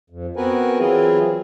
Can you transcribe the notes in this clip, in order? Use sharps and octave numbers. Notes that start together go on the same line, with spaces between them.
F2
B3 C4 F#4 A#4 B4 G#5
E3 F#3 C4 E4 F4 G#4